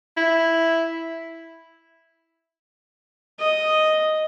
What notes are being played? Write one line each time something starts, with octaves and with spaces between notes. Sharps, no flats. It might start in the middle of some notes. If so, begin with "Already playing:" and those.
E4
D#5